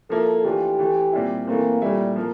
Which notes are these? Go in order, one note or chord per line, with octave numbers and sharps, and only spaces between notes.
F3 A#3 E4 A4
E3 A3 D4 F4 G4
E3 A3 E4
A#2 G3 C4 E4
E3 A3 A#3 C4
A#2 G3 A3 E4
F3 A#3